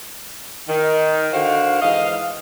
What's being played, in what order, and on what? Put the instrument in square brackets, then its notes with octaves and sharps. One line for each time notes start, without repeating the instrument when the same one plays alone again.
[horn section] D#3
D3 D#3 F#4 C5 F5
G#2 E3 D#5 F5